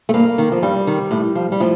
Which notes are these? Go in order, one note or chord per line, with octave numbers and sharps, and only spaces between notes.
A3
G2 A#3
D#3
F3
G2 G3
D#3
A2
F3
G3
A2 F3